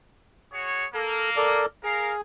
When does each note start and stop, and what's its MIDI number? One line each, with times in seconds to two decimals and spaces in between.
0.53 0.86 66
0.53 0.86 68
0.53 0.86 73
0.94 1.64 58
0.94 1.30 69
1.36 1.66 69
1.36 1.66 70
1.36 1.66 74
1.84 2.21 68
1.84 2.13 70
1.84 2.13 77